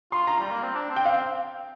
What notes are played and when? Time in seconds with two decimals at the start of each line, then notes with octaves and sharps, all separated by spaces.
0.12 F4 C6
0.27 A#5
0.39 G3
0.51 A#3
0.63 C4
0.75 D4
0.91 C4
0.96 G5
1.05 F5